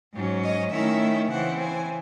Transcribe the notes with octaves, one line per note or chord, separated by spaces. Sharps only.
G#2 F#3 C#4
D#5
D#3 A3 C#4 E4 E5
C#3 E3 C4 E4 F#5
G#5